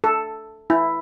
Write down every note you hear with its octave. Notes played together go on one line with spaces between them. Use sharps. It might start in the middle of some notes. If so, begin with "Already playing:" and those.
A4
E4